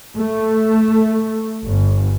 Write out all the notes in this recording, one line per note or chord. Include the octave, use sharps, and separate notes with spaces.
A3
G1